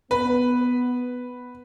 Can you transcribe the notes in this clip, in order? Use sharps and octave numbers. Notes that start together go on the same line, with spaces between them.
B3 B4